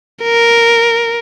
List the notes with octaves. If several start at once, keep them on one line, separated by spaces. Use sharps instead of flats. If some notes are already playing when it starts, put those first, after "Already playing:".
A#4